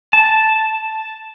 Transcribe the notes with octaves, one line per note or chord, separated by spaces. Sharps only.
A5